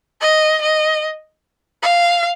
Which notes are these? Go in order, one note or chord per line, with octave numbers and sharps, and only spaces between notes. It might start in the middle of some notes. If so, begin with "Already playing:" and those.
D#5
D#5
F5